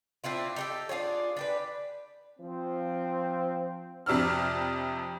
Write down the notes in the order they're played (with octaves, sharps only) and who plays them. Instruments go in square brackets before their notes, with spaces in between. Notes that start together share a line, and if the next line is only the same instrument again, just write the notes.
[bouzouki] C4 D4 E4 F4
D#4 G4 A4
D4 F4 G#4 C#5
D4 G4 B4
[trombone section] F3 C4
[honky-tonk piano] F2 C3 D4 E6 F6